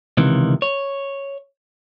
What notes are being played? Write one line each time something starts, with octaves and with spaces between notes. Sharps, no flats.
C#2 C3 D#3 E3
C#5